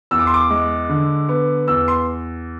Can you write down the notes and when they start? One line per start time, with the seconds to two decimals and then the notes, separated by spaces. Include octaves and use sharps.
0.11 E2 E6
0.19 D6
0.27 C6
0.34 D6
0.50 G#3
0.89 D3
1.29 B3
1.68 E2 E6
1.88 C6